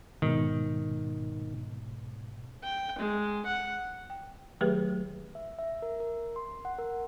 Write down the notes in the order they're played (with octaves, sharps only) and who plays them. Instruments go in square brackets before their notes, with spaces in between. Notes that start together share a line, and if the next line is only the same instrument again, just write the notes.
[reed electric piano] G#2 B2 [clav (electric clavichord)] D#3
[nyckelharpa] G5
G#3
F#5
[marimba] G5
D#3 F#3 A3 G4 G#4 B4
[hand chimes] E5
E5
A#4
A#4
C6
F#5
A#4